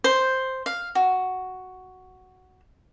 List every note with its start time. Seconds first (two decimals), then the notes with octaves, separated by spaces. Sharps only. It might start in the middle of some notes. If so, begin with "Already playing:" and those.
0.04 C5
0.66 F5
0.95 F#4